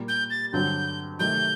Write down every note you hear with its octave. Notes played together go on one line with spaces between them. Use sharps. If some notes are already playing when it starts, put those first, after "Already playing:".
Already playing: A#2 G3 A#3
G6
A6
G2 D3 F#3 C4 F#4 G6
C3 D#3 F#3 A3 G6